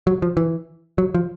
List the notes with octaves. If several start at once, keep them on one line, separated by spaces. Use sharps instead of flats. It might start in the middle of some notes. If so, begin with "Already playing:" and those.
F#3
F3
E3
F#3
F3